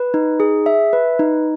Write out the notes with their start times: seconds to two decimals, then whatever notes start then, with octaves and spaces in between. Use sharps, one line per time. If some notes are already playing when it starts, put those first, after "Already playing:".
Already playing: B4
0.14 D#4
0.40 G#4
0.66 E5
0.93 B4
1.19 D#4